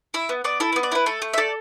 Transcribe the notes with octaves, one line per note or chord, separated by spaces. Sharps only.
E4 E5
B3
B3 D5
E4 A4
B3 B4
D5
E4 B4
A3 A4
A3
E5
A4 D5